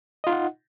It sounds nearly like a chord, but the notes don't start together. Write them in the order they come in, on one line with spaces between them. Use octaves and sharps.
D#5 F4 D#4 F#5